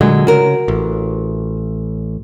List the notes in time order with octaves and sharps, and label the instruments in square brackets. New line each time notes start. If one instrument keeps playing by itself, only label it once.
[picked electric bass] A#2 D3 F#3 [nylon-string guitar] G#3
[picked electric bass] C#3 [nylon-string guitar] F#4 A#4
[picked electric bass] A1